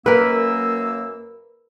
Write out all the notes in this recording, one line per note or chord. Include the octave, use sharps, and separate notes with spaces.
F#2 A#3 A#4 B4 E6